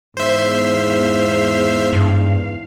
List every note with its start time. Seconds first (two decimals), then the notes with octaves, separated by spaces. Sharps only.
0.17 E2 G#2 C5 E5 F5
1.93 G2